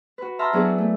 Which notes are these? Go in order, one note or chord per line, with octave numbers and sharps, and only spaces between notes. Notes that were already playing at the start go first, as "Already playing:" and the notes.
F#4 B4
E5 A5 A#5 C6 F6
F#3 B3 D4 E4 F#4 G#4
A3